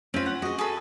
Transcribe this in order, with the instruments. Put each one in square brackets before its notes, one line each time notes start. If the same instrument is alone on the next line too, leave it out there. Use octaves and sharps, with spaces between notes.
[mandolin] C4 B4 [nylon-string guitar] C#4 F4
[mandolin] F#5
[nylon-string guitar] F#4 [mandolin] G#4 D#5
[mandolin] G#4 A4 B4